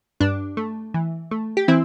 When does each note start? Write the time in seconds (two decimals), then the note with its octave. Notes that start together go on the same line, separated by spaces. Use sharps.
0.20 G2 D4
0.57 A3
0.94 E3
1.31 A3
1.57 G4
1.68 E3 C4 E4